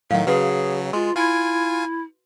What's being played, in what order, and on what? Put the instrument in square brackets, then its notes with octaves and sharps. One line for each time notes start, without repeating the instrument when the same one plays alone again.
[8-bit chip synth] A2 D#3 [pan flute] F#3 [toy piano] F5 F#5
[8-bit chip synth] C#3 F#3 [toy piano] F#4 B4 [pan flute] G#4
[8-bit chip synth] G#3 [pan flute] F4 [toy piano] C6
[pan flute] E4 [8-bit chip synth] F4 G#5